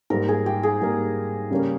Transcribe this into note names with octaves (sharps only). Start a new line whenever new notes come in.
G#2 G3 A#3 A#4
G#4
G4
G#4
G#2 G3 A#3
C#3 G3 A#3 C#4